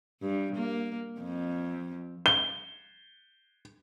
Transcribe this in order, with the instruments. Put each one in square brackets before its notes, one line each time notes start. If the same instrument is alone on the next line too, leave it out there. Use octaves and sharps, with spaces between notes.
[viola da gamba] G2
A#3
F2
[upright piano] G7